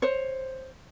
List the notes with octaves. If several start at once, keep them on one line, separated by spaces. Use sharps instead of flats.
C5 C#5